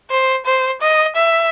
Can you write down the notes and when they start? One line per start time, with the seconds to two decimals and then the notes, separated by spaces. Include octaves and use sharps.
0.11 C5
0.46 C5
0.81 D#5
1.16 E5